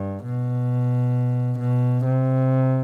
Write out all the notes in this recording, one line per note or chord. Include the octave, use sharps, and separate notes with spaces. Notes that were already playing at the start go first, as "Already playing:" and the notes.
Already playing: G2
B2
B2
C3